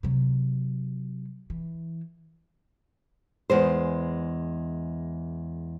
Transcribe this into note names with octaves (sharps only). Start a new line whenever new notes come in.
C3 F#3
E3
E2 G#3 C5